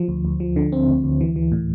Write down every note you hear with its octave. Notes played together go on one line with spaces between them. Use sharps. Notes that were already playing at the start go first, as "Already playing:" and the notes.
Already playing: F3
D2
D2
F3
D3
C4
D2
D2
E3
E3
A2